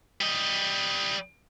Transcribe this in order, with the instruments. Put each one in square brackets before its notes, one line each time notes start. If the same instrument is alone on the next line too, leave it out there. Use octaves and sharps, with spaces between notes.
[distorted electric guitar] G3 D#5